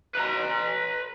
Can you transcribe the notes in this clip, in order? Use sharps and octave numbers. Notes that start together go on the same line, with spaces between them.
B4 A#5